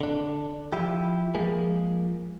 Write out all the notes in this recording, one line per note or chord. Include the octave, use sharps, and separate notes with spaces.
D3 D4
F3 E4 G4
F3 G#3 A#3 G#4